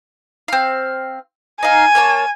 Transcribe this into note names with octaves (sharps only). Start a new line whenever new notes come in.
C4 F5
D#4 F5 G#5
A#3 C#5 A5